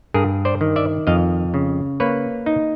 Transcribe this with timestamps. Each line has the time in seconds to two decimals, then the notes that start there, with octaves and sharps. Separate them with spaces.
0.14 G2 G#4 A#4
0.45 C5 D5
0.61 D#3
0.76 D5 E5
1.07 F2 D#5 F5
1.54 C#3
2.00 A#3 B4 C#5
2.46 D#4